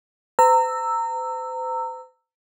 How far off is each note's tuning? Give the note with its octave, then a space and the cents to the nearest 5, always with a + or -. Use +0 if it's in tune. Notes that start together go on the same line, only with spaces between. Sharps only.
C5 -45 A#5 -25 E6 +0